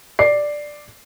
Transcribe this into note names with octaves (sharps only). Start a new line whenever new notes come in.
D5 C7